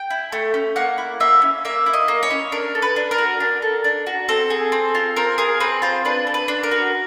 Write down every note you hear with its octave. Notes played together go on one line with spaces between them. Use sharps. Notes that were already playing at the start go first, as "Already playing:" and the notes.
Already playing: G5
E4
A3
C#4
A#3 F#5
E4
A#3 E5
C#4
A#3 E5
E4
D#5
A#3
C#5
C#4
D4 A#4
A4
B4
D4
A#4
F#4
D4
A4
D4
F#4
C4 A4
G#4
C4
F4
C4 A#4
G#4 A#4
C4 B4
F4 C5
D4 B4
A4
B4
D4
A#4
F#4